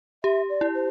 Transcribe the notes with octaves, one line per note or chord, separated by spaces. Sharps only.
G4 E5
D5
E4
C5